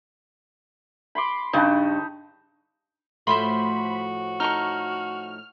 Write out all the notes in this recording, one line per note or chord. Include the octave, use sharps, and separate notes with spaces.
B5 C6 D6
G2 C#3 D#4 A5
A2 F3 A3 F#4 C5 E5 B5 C6
D#4 A4 C#6 F6